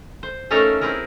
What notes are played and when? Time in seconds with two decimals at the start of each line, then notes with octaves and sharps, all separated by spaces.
0.23 C5
0.51 A3 C#4 D#4 A4 A#4 F5
0.81 C4 E4 G#4 A#4